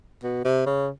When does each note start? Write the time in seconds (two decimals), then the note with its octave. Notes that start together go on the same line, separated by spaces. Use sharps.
0.23 B2
0.45 C3
0.66 C#3